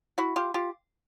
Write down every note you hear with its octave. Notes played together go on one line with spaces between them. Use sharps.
E4 F#4
F4 G4
F4 G4